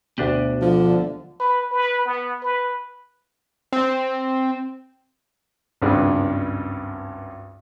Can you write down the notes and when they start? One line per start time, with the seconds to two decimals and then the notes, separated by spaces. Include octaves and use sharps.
0.18 D2 B2 D4 G4
0.61 D3 F3
1.40 B4
1.72 B4
2.05 B3
2.43 B4
3.72 C4
5.82 G#1 C#2 G2 G#3